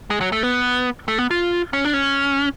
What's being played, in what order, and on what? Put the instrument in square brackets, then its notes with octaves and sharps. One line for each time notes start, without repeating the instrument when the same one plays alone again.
[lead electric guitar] G#3
F#3
A3
B3
A3
B3
F4
C#4
D4
C#4